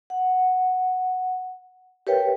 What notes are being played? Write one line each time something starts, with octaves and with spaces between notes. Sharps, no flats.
F#5
G4 A#4 B4 C#5 E5 G5